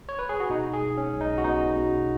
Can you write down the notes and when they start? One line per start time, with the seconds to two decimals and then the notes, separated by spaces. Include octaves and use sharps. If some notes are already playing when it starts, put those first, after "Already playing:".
0.09 C#5
0.19 B4
0.29 G#4
0.40 F#4
0.50 B2 D#4
0.74 G#4
0.81 G#3
0.97 C#4
1.13 B1
1.21 D#4
1.38 F#4
1.44 B3 D#4
1.76 B2